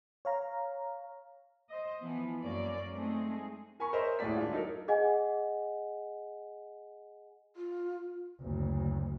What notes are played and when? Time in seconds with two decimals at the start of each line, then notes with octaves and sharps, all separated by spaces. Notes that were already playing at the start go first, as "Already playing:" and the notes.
0.25 C#5 F5 A#5
1.70 C5 D#5
2.02 E3 F3 B3
2.42 F#2 A#3 C#4 D5
2.92 G#3 A3 C4 D#4 G#4
3.80 A#4 G#5 B5 C#6
3.93 A#4 C5 C#5 D#5 E5
4.19 D#1 A2 G#3 D5 B6
4.37 D4 F4
4.51 F#3 D#4 A4 A#4
4.88 G#4 D#5 F#5 G#5
7.56 F4
8.41 F#1 D2